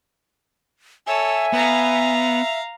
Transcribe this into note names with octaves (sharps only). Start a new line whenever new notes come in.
A4 C#5 E5 G#5
B3 F5 A#5